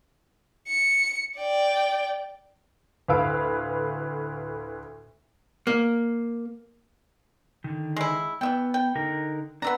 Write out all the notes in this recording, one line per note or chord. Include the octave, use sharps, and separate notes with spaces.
C#7
D5 G5
D2 A2 B4 F5 E6 D7
A#3
D3 D#3
G#3 E4
E3 B3 E5 G5
G5
D3 D#4 A#4
B3 D4 B4 E5 A#5